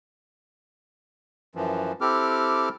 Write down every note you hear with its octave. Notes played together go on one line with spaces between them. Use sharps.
F#2 E3 F3
C4 E4 G4 A4 D6 F6